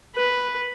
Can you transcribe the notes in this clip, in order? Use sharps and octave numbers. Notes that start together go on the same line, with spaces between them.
B4